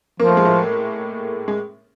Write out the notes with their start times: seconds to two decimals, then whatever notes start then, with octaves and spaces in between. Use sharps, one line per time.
0.20 F3 A#3
0.27 A3
0.37 G#3
0.45 A2 A3
1.48 G#3